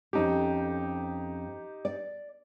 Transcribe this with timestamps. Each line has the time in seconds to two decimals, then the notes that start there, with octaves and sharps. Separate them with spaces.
0.13 F2 C#4 D#4 G4 A4
1.85 D5